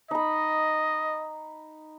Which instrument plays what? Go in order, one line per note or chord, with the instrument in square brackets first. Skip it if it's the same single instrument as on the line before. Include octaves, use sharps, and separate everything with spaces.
[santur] D#4 B5 [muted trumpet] D#5